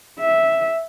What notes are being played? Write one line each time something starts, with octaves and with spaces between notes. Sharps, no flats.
E5